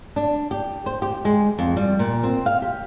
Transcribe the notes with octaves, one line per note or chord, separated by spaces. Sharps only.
D4
G4
C5
G4
G#3
F2
G3
A#2
C4
F5
G4